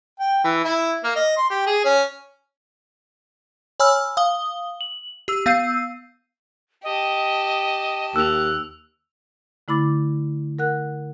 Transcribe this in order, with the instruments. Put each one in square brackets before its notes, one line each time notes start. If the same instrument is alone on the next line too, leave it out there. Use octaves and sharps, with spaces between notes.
[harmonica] G5
E3
E4
A#3
D#5
C6
G4
G#4
C#4
[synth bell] C#5 G#5 B5 E6 F6
F5 D#6 G7
F#7
G4 E6
B3 F5 E6 G6 C7 D#7
[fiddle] G4 A5 [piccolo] D#5
[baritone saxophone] D#2 [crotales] E6 F7 [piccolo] F#6
[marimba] D3 A3 E4 B5 D6 A6
A#4 F#5 F#6